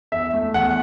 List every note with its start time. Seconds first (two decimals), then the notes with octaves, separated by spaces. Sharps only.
0.12 E2 E5
0.33 A3
0.54 E2 F#5